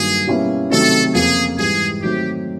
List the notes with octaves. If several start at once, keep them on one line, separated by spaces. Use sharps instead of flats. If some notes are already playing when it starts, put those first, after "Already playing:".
Already playing: G2 D#3 F#3 A#3 G#4
B2 G3 A#3 C#4 E4
C3 D#3 F#3 A3 A4
F2 C#3 F3 A#3 G#4
G#2 E3 G3 G#4
D#3 F#3 A3 C4 G4